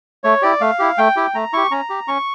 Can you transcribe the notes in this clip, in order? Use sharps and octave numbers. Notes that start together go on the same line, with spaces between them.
A3 C#5
E4 G4 D5
A3 F5
E4 G4
A3 G5
E4 G4
A3 A#5
E4 G4 C#6
C#4 A#5
G4
C#4 C#6